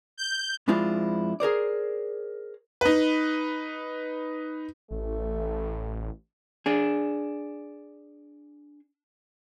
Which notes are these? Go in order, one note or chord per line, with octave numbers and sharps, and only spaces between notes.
G6
F2 G#3 D4 E4 F4 C5
G#4 A#4 C5 D5
D#4 B4
A1 A3
D4 G#4